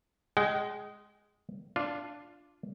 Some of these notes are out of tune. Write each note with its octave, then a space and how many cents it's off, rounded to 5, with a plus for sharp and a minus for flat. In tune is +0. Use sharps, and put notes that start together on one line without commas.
G#3 +0 G5 -40
D4 +0 F4 +0